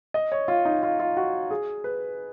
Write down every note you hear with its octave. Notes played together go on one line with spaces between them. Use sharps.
D#5
C#5
F4
D#4
F4
F4
F#4
G#4
B4